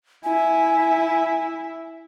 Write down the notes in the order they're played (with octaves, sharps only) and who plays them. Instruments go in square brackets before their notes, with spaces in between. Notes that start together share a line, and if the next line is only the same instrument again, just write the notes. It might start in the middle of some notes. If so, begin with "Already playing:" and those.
[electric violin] E4 E5 [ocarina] G#5